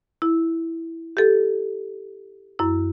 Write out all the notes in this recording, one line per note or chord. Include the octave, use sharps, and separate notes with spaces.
E4
G4 A4
F#2 E4